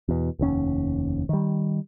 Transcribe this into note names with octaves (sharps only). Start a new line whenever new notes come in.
E2 B2
F1 D#2 C#4
D#3 G3